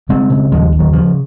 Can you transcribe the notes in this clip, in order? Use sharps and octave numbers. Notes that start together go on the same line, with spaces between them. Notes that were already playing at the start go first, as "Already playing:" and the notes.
C#3 G#3 C4
C#3
D#2 F3 G#3
D#2
D#3 F#3
C#3 F3